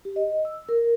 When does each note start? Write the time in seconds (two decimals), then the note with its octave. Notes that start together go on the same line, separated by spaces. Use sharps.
0.05 G4
0.16 D#5
0.45 E6
0.69 A#4